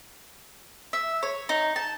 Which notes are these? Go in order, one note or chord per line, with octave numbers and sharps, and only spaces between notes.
E5
C#5
D#4
A5